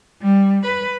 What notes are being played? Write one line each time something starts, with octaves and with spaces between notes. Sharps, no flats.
G3
B4